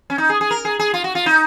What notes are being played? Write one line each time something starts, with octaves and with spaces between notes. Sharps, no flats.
C#4
D#4
G#4
G#4
A#4
G#4
G#4
F4
F#4
F4
D#4